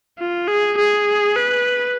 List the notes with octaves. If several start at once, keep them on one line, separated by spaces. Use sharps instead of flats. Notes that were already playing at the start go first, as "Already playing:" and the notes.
F4
G#4
G#4
B4